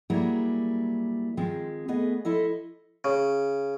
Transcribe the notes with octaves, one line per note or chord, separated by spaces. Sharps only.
F#3 G3 A#3 E4 G#4 A#4
D#3 F3 G#3 C4
A3 B3 G#4 D#5
F3 E4 A4 D#5
C#3